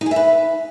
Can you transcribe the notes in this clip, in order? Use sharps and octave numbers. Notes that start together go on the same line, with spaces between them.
D#4
G#4
E5
B4